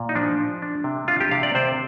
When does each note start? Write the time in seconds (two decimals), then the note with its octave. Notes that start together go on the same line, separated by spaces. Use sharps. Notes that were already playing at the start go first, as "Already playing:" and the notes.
Already playing: A#2
0.09 D#4
0.15 F3 D4
0.39 F3
0.62 D4
0.84 C3
1.08 D4 F4
1.20 G4
1.31 C3 F5
1.43 D5
1.55 C3 C5